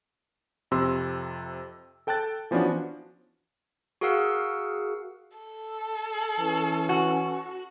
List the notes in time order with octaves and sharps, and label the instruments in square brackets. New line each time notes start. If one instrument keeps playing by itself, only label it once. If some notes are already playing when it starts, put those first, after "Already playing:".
[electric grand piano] F2 C3 C6 E6
A4 G5 A5 F#6 A6
E3 F3 B3 C#4 D4 F#4
[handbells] F#4 G#4 A#4 F5 F#5 E6
[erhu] A4
[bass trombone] E3 [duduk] C#4
[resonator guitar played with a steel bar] F#4